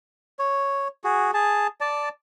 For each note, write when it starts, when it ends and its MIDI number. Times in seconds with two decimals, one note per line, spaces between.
0.39 0.88 73
1.04 1.31 66
1.04 1.31 68
1.34 1.67 68
1.34 1.67 81
1.81 2.09 74
1.81 2.09 81